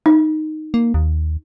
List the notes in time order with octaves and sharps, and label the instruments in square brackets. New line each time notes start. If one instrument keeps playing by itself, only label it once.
[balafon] D#4
[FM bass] A#3
D#2